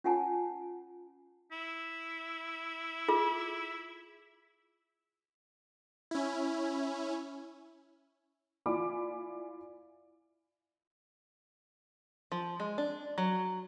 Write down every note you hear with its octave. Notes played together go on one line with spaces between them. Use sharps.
C#4 F4 F#5 G#5 A5
E4
F4 G#4
C#4 E4
E4 F4 D5 G#5 B5 D6
F3
G#3
D4
F#3